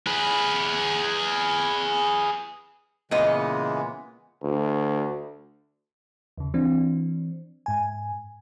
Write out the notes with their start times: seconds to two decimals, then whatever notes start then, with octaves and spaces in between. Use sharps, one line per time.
0.07 G#4 B4
3.11 A#2 C#3 E3 G#3 B3 D#5
4.43 D2
6.38 D#2 C#3
6.54 E3 C4 D4
7.66 G#2 G#5